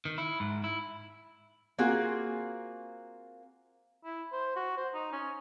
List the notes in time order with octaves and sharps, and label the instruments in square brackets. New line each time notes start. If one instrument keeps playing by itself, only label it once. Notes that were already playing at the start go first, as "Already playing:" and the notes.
[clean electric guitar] D#3
E4
G#2
E4
[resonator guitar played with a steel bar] A#3 C4 F4 F#4 G#4
[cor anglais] E4
C5
F#4
C5
D#4
C#4